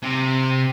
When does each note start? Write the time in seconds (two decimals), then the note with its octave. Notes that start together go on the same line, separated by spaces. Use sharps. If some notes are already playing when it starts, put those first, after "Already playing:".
0.02 C3